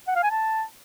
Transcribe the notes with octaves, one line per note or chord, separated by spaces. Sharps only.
F#5
F5
G#5
A5